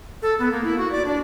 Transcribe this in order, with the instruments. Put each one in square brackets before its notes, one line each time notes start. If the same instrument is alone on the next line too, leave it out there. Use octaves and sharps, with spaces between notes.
[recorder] A4
B3
A#3
E4
F#4
D5
D4